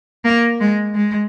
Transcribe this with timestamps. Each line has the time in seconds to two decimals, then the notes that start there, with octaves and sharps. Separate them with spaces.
0.25 A#3
0.60 G#3
0.94 G#3